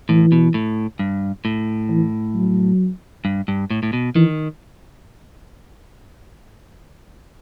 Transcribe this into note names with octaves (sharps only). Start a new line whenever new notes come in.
A2 E3
B2
A2
G2
A2
E3
F#3
G2
G2
A2
A2
B2
D#3 E3